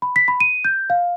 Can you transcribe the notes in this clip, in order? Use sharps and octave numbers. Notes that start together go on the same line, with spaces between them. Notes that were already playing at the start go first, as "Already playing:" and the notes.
B5
B6
B5
D#7
G6
F5